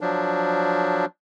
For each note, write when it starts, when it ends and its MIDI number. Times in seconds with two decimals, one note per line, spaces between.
0.01 1.05 53
0.01 1.05 54
0.01 1.05 62